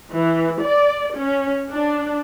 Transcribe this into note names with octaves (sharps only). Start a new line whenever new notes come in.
E3
D5
C#4
D4